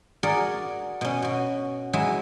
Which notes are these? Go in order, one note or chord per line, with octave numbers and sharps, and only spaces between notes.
F#4 G#4 A#4 D5 F#5
B2 C#4
B2 F#4
F#3 G#3 E4 F#4 G#4 E5